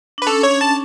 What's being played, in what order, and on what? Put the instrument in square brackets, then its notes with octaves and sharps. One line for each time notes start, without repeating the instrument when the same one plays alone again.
[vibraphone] D4
[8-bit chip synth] B4
[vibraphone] C#4 [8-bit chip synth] A4
[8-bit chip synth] C#5
[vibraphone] C#4
[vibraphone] D4 [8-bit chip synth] A5